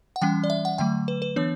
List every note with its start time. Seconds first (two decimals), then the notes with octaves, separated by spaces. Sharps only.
0.16 F#5
0.21 E3 G3 C#4 G5
0.44 D5
0.50 E5
0.65 F#5
0.78 D3 F#3 A3 G5
1.08 B4
1.22 B4
1.36 E3 B3 D4 C#5